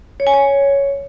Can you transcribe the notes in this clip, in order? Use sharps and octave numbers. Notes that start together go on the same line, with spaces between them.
C#5
G#5
C#5